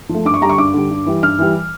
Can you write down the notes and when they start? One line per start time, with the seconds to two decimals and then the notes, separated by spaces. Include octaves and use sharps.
0.09 F3
0.14 A3
0.25 G2 D6
0.34 C#6
0.41 G3 A#5
0.45 D3 C#6
0.58 G2 D6
0.73 D3 G3
0.91 G2
1.06 E3 G3
1.23 G2 F6
1.39 E3 G3